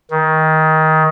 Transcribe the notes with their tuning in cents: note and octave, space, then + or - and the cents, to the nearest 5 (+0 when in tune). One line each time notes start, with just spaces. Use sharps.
D#3 +20